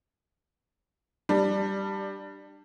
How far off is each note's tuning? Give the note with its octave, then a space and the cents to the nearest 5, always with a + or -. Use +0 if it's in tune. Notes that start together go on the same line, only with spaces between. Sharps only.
G3 +0 D4 +20